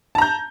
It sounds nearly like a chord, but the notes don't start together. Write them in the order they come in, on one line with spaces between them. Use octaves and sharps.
A5 A#5 G6